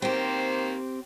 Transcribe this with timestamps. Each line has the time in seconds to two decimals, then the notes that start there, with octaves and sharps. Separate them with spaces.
0.02 D#3 A#3 C4 G4 C5